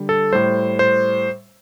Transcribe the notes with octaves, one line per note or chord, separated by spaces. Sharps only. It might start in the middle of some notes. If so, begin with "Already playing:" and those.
Already playing: D3 G3
A4
A2 G3 C5
C5